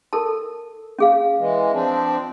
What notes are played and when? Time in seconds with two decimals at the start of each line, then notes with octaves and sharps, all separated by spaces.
0.13 A4 A#4 A5
0.99 C#4 G#4 F5
1.38 E3 G#3
1.72 F3 C4 D4